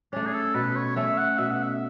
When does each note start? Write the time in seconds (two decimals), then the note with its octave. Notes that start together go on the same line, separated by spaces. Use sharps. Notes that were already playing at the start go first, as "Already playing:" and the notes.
0.13 A3 C#4 D4
0.27 G#4
0.33 A4
0.55 B2 B4
0.76 C#5
0.96 A3 C#4 E5
1.18 F#5
1.38 B2 E5
1.51 F#5
1.64 E5